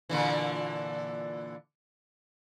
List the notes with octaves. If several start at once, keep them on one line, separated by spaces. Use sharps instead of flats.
A#2 D3 E3